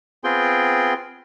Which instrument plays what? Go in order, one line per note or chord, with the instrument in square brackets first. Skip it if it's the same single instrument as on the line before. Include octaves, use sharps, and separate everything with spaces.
[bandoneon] B3 C4 F4 G#4 G5 C6